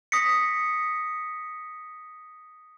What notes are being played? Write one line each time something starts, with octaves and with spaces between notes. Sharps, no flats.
D#6 A#6 B6 C#7